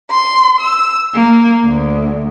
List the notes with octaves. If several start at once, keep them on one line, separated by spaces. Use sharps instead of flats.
C6
E6
A#3
D2